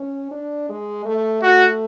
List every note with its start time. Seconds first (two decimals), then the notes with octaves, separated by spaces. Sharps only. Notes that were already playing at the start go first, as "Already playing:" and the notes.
Already playing: C#4
0.31 D4
0.69 G#3
1.05 A3
1.42 A3 F#4